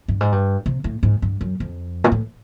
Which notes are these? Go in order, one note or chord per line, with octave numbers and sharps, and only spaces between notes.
G2
G#2
G2
C3
A2
G#2
G2
F#2
F2
A#2
A2